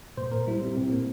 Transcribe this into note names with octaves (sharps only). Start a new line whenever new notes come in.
A#2 C5
A#2 A#4
G3 E4
G3 C4
A#2 C4
A#2 A#3